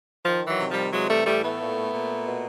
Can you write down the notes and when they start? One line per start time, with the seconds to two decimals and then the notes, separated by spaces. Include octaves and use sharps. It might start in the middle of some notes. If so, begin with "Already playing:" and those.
0.25 D#3 F3
0.47 E3 F#3
0.59 C3
0.70 F3 G3
0.92 E3 F#3 G#3
1.09 G3 A3
1.26 A2 G3 A3
1.43 A3 B3
1.60 A#2
1.93 A#2
2.27 B2